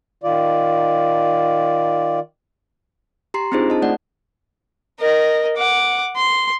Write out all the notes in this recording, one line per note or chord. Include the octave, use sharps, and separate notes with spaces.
D#3 F4 D5
G4 A#5 C6 C7
C4 D4 D#4 F4 G#4 C5
D#5 A5
A3 D5 F#5
A#4 D#5
F#5 D6
C6